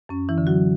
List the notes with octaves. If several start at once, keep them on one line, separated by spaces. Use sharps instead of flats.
F#2 C#4
E3 E4
D3
F#3 F#4